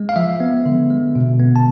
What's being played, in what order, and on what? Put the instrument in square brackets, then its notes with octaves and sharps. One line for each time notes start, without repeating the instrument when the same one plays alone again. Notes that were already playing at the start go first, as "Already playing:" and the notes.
Already playing: [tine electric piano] G#3
F5
F3 E5
B3
D3
G#3
B2
B3
A5